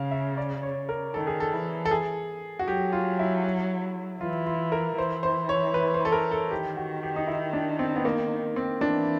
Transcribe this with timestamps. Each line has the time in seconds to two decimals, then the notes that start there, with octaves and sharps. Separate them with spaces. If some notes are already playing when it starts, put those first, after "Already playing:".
Already playing: C#3 F5
0.11 E5
0.37 D5
0.63 C#5
0.89 A#4
1.14 D#3 A4
1.27 G#4
1.40 A4
1.53 E3
1.85 A4
1.91 G#4
2.59 F#4
2.68 F#3 G4
2.93 F4
3.19 E4
4.21 E3 F4
4.47 F4
4.72 A#4
4.98 E3 C5
5.23 C5
5.49 C#5
5.74 B4
5.94 C5
6.05 A4
6.12 A#4
6.31 A4
6.51 D#3 G4
6.77 F#4
7.03 G4
7.16 D#4
7.27 E4
7.53 D4
7.79 C4
7.96 B3
8.05 A#3
8.56 C4
8.81 E3 D4